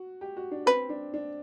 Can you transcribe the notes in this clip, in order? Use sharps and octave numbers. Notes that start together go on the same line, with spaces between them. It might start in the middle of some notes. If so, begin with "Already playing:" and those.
Already playing: F#4
G4
F#4
D4
C4 B4
D4
D4